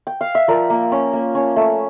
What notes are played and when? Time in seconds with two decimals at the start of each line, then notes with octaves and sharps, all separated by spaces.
0.07 G5
0.21 F5
0.35 E5
0.48 F3 A#4 D5
0.70 A#3
0.92 C#4
1.13 A#3
1.35 C#4
1.56 A3